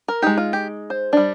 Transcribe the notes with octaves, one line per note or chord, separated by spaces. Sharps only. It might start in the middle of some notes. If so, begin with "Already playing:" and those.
A#4
G#3 D#4 G4
F4
G4
C5
G3 D4